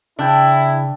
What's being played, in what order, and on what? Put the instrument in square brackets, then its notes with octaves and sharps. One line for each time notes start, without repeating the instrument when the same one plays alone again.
[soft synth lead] C#3 [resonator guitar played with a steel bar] D4 [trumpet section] E4 [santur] E5 G5 A5